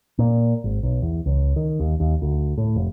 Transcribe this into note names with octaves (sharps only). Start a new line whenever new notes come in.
A#2
G#1
B1
E2
C#2
D#3
D#2
D#2
D2
A2
F1